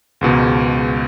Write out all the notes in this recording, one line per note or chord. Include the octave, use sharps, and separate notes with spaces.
C#2 G#2 B2 D#3